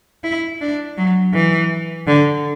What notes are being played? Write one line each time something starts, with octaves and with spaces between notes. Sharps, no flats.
E4
D4
F#3
E3
D3